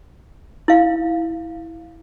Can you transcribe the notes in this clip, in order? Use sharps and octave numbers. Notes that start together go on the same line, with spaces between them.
E4 F5